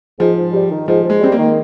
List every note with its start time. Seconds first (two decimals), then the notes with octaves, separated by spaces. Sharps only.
0.19 G#2 F3
0.37 G#2
0.53 G3
0.71 D#3
0.88 G#2 F3
1.04 G#2
1.10 G#3
1.21 G3 C4
1.32 A#3
1.38 D#3